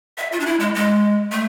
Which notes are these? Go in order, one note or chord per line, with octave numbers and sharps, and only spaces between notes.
E5
F4
D4
E4
G#3
G#3
A3